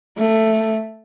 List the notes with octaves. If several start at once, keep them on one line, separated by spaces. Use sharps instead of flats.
A3